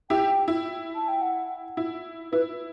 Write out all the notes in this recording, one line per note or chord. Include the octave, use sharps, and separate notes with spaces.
E4 G4 G5
E4
A5
G5
F#5
E4
E4 B4